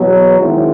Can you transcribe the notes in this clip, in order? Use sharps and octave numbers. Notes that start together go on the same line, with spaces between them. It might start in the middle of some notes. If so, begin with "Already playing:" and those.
Already playing: E2 B2 F#3
D#3 G#3 C4 E4